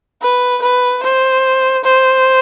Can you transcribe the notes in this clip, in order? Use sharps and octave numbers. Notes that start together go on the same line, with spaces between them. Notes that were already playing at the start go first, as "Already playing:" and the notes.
B4
B4
C5
C5